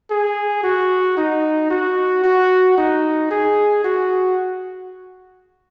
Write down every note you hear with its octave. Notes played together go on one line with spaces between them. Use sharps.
G#4
F#4
D#4
F#4
F#4
D#4
G#4
F#4